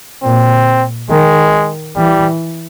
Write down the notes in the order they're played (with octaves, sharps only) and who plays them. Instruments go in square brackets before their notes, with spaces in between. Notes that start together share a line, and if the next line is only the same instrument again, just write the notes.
[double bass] A#2 [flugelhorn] C4
[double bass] D#3 [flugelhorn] G#3
[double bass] E3 [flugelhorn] G3